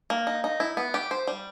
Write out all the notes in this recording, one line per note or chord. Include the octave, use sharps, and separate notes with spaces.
A#3
D#4
D#4
E4
B3
G4
C5
G3